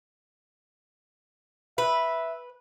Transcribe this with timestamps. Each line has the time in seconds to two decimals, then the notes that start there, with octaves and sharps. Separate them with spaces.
1.78 B4 E5